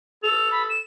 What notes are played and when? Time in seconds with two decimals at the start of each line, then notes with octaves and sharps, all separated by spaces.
0.23 A4 F7
0.51 B5
0.70 E7